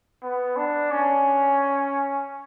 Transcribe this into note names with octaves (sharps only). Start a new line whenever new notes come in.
B3
D4
C#4